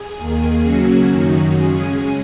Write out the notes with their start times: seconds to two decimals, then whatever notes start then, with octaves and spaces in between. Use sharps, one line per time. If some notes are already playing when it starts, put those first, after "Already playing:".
Already playing: G#4
0.17 D#2 D#3 A#3
0.62 C#3 F#3 A#3 C#4 F#4
1.06 F#2 D#3 F#3 D#4
1.51 C#3 G#3 C#4 G#4